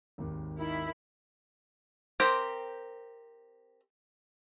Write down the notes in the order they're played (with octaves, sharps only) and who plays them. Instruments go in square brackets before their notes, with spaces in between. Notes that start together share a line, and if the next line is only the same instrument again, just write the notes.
[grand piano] G#1 D#2
[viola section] D#3 E4 B5
[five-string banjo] C4 G4 A#4 C5